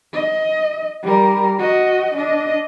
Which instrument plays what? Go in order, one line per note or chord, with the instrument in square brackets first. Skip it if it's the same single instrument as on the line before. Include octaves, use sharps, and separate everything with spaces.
[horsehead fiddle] D#5
G3 A#4
F#4 D#5
D4 D#5